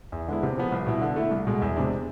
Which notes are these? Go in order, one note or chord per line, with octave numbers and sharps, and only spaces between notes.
E2
D3 G#3 B3 E4
C3
F3 B3
C2
B2 B3 E4
D3
A3 E4
C2
B2 G#3
E2
C3 G#3 D4